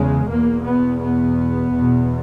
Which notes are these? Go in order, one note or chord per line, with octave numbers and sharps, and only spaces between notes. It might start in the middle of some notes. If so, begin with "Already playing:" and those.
Already playing: E2 C#3 G#3
E2 B2 A#3
B3
B3
E2 B2